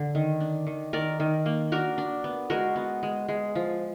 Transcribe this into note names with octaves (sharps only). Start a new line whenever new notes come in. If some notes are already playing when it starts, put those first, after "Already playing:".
Already playing: D3
D#3
D4
D#3
D#3 A#4 D5
D#3
A#3
D4 F#4 A#4
D4
B3
G#3 F#4 A#4
B3
G#3
G#3
F3